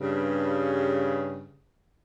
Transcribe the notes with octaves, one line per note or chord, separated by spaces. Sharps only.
G2 C#3